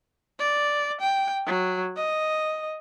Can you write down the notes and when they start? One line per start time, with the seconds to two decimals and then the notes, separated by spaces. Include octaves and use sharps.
0.39 D5
1.01 G5
1.46 F#3
1.96 D#5